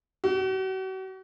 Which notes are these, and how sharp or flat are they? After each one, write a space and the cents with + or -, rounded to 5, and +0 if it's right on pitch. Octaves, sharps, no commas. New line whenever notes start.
F#4 +40